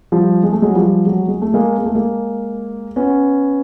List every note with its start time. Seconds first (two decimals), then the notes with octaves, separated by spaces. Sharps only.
0.12 F3 G3
0.43 G#3
0.53 A3
0.62 F#3 G#3
0.75 F3 G3
1.06 F#3 G#3
1.28 G#3
1.42 A3
1.54 G#3 A#3
1.78 A#3
1.86 A3
1.95 G#3 A#3
2.96 B3 C#4